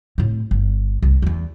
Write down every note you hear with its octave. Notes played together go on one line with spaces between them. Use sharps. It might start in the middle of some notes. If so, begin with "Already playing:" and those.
A2 C4
G1
C2
E2 E3